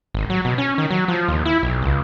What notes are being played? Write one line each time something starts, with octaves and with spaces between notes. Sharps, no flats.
G#1
F#3
B2
C#4
D#3
F#3
F3
D#2
E4
B1
C#2